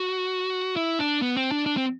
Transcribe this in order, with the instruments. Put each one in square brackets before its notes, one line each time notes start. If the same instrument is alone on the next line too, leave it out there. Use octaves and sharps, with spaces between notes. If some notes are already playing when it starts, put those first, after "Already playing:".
Already playing: [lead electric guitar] F#4
E4
D4
B3
C4
D4
D4
C4